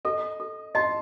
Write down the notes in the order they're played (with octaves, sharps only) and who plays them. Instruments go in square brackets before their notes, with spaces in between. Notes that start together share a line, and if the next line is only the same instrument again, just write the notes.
[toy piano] A4 [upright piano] D#5
[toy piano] A4
[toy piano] D#5 [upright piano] A5 C6